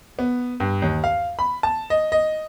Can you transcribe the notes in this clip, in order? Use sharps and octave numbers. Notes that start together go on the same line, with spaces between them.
B3
G2
D#2
F5
B5
A5
D#5
D#5